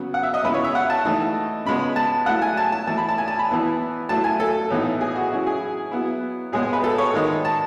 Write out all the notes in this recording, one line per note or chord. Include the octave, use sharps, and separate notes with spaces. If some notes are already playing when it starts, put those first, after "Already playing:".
Already playing: C#3 F#3 B3
F#5
E5
D#5
C#3 G#3 B3 E4 B4
C#5
E5
F#5
A5
E3 A3 D#4
C#3 G#3 B3 B5
A5
F#3 A3 E4 F#5
G#5
A5
A5
E3 A3 E4 A5
B5
A5
G#5
A5
B5
E3 B3 E4
F#3 A3 E4 A5
G#5
A4
A2 E3 B3 D#4
G#4
F#4
F#3 C#4 E4
G#4
F#3 B3 E4
A2 G#3 B3 G#4
B4
A4
C#5
D#3 G#3 D#4
A5